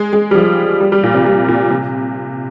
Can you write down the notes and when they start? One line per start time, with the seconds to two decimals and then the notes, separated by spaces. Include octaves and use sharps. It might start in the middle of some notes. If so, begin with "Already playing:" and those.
Already playing: G#3
0.13 G#3
0.31 G3
0.35 F3
0.80 G3
0.92 G3
1.03 A#2
1.14 C3
1.25 G3
1.48 A#2
1.71 C3